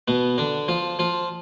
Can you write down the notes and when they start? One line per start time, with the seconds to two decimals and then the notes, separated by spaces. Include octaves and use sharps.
0.08 B2 B3
0.38 D3 D4
0.68 F3 F4
0.99 F3 F4